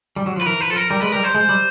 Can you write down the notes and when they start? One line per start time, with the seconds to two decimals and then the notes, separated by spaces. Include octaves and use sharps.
0.16 G3
0.26 F#3
0.36 F3
0.41 B4
0.46 E3 A#4
0.61 B4
0.68 F3 A4
0.76 A#4
0.90 G3 A#4
1.02 G#3 B4
1.12 G3 A#4
1.24 C5
1.35 G#3
1.49 G3